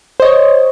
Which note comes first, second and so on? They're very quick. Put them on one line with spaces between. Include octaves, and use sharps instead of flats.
C5 D#5 C#5